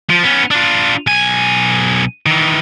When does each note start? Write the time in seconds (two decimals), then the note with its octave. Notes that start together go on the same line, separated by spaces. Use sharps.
0.10 F3
0.23 B3 C#4
0.51 D4 F4
1.07 B1 G#5
2.26 D#3 E3